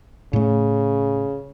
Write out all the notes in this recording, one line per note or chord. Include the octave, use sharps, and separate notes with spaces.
A2 C#3 A3